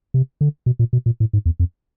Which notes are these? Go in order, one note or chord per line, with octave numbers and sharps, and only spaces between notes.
C3
D3
B2
A#2
B2
A#2
A2
G#2
E2
F2